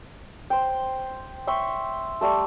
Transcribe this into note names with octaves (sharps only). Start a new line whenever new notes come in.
C5 G5
E5 G5 C6 C#6
G3 A3 A4